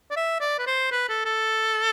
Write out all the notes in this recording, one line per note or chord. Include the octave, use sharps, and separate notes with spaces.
D5
E5
D5
B4
C5
B4
A4
A4